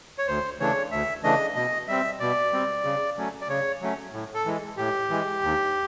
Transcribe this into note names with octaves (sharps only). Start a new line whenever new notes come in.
C#5
D2 C5
C#3 E3 A3 D4 C#5
D2 E5
C#3 E3 A3 D4 D#5
B2 D#5
G3 C4 E5
B2 D5
G3 C4
C#3
F#3 A3 C#4
D5
C#3 C#5
F#3 A3 C#4
A2
A4
E3 G#3
A2 G4
E3 G#3
D#2